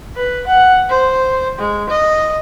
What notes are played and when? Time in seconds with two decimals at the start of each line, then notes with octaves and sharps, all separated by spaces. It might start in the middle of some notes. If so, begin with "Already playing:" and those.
0.16 B4
0.46 F#5
0.89 C5
1.59 G#3
1.89 D#5